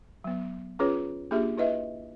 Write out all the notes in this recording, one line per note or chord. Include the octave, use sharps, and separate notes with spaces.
F#3 B3
C#4 F4 G#4 B4 C#5
A#3 D4 F4 G4 G#4 E5
E4 B4 D#5 E5